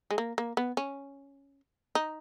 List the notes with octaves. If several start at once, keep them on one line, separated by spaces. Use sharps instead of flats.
G#3
A#3
A#3
B3
C#4
D#4